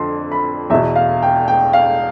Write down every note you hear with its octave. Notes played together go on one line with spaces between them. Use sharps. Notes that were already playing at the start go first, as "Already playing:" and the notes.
Already playing: F2 D3 F3 C6
B5
E2 B2 E5
F5
G5
G5
F5